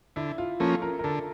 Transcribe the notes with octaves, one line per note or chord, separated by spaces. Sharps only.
D3 E4
F4
F3 A#3 C#4 A4
A#4
A#4
D3 A4